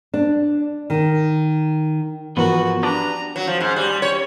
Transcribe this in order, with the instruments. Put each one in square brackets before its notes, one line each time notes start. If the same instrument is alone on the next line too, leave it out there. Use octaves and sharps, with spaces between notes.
[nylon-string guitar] D4
D#3
[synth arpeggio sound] G#2 E3 A#4 [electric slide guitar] F3 B3 B4 [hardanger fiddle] F#4
[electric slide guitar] D4 G4 B4 [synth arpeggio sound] A5 D6 F#6 [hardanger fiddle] A#5
[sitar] F#3
F3
G#2
G3
C#5